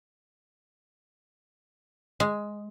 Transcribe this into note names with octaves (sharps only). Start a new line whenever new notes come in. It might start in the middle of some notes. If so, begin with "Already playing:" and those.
G#3